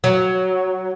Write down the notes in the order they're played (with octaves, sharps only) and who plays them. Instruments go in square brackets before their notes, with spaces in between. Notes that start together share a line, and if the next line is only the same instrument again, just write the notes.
[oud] F#3